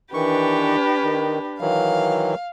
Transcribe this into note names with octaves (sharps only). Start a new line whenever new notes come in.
D#3 E3 D4 G4 B4 C#6
D#3
D#3 E3 F#3 F5